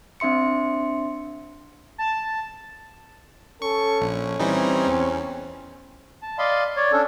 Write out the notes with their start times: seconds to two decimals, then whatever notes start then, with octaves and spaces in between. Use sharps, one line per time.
0.20 C4 D4 E5 C6 C#7
1.98 A5
3.62 C#4 A4 C#6
4.00 A#1
4.39 E3 G3 C4 D#4
4.87 E2
6.22 A5
6.38 D5 D#5 F5 B5 C6
6.76 C#5 D5
6.92 C#4 D4 A4